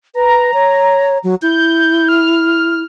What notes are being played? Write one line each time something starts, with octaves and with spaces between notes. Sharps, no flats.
B4 A#5
C#5
F#3
E4 G6
F6